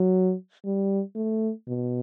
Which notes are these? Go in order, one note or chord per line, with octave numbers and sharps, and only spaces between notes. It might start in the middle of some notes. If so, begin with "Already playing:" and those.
Already playing: F#3
G3
A3
B2